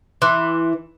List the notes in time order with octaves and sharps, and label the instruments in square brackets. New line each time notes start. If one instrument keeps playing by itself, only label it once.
[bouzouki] E3 [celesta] C6 D6 F#6